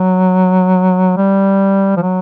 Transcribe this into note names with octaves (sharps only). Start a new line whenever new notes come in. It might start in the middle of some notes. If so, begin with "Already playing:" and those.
Already playing: F#3
G3
F3
F#3